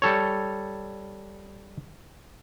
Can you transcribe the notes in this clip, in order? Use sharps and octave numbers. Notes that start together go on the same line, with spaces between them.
G3 A4 C#5